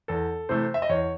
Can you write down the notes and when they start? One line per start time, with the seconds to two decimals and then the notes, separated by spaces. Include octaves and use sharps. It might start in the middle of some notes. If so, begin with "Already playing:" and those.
0.08 E2 A4
0.49 C3 E3 A3 C5
0.74 E5
0.82 D#5
0.89 E2 C#5